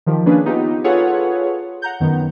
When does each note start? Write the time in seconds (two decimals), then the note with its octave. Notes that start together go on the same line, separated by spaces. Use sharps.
0.06 D#3 F3 G4
0.26 A#3 C#4 D4 G#4 B4
0.45 B3 D#4 F4 G4
0.84 F4 G#4 A4 B4 C#5 F#5
1.82 F#5 A#5 G6
2.00 F#2 D#3 B3